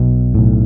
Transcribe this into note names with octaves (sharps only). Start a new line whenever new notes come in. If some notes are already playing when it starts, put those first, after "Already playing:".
Already playing: B1 B2
B1 A2